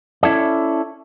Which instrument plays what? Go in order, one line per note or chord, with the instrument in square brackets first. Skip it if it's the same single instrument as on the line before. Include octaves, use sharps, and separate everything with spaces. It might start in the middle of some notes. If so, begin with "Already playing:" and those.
[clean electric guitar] C#4 E4 A4 D5